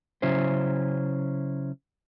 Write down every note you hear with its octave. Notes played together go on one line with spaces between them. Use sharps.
C#3 F#3 C#4 E4 C5